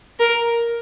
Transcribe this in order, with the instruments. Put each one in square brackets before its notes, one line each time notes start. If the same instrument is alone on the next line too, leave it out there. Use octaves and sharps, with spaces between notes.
[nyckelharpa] A#4